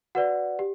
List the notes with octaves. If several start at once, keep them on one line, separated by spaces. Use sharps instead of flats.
F#4 B4 D5 F#5
G4